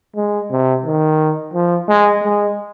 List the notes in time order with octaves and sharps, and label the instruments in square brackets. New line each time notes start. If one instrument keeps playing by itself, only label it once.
[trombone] G#3
C3
D#3
F3
G#3
G#3